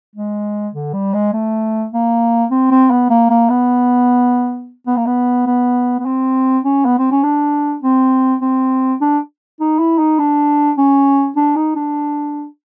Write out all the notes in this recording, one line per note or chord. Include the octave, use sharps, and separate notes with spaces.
G#3
D3
G3
G#3
A3
A#3
C4
C4
B3
A#3
A#3
B3
B3
A#3
B3
B3
B3
C4
C#4
B3
C4
C#4
D4
C4
C4
D4
D#4
E4
D#4
D4
C#4
D4
D#4
D4